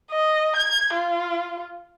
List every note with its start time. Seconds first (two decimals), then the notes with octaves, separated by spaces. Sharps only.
0.11 D#5
0.56 G#6
0.93 F4